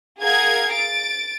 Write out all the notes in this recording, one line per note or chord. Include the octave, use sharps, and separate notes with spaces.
G#4 A#4 F5 F#5 G#6
A6 D7